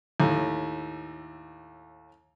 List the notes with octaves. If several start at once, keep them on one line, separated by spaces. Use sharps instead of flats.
D#2 A2